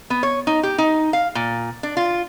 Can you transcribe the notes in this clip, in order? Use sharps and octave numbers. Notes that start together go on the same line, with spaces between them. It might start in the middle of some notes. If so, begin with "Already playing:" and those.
B3
C#5
D#4
G4
D#4
F5
A#2
D4
F4